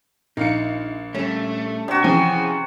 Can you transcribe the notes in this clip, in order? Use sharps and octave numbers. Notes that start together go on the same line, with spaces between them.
A#1 D#4 F5 C#7
G3 A3 C#4
C3 D4 F#4
C#3 E3 F3 C5 G#5